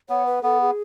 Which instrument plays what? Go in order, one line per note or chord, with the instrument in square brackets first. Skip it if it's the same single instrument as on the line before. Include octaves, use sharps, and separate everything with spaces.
[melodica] B3 [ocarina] C#5
[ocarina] B4
[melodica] B3 [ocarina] A4
[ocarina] G#4